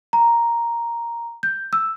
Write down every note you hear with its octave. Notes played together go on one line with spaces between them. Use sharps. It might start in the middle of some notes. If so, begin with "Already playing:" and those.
A#5
G6
E6